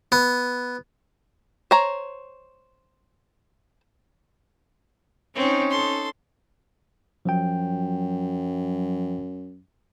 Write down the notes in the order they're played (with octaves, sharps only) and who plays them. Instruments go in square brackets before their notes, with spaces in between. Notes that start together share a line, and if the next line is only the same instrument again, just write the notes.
[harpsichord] B3
[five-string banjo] C5 C#5 A#5
[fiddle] C4 [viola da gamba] C#4 D#4
[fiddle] A4 C6
[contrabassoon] F#2 [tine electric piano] F3 F#3 G5